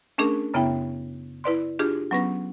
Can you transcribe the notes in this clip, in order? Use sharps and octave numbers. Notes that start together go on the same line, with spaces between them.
A3 C#4 D4 G#4 A#4
F#2 C#3 B3 E4 E5 G5
E4 B4 D5 C6
D4 F4 G4 G#4
F#3 B3 C#4 B4 A#6